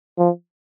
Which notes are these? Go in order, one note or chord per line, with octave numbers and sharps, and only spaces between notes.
F3